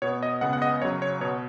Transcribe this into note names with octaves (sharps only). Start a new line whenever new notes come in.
B2 B3 C#5
D#5
C#2 C#3 B3 F#5
F#5
D#5
F#2 C#3 F#3 C#5
C#5
B2 B3 C#5